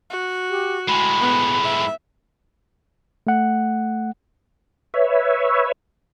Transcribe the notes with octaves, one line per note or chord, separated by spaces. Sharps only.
F#4
G4
A2 G#3 B5
B3
E5
A3 F#5
B4 C#5 E5